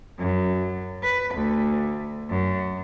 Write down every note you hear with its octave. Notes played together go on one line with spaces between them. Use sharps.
F#2
B4
D2
F#2